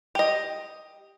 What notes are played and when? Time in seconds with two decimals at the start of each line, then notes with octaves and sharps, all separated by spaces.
0.15 G4 D#5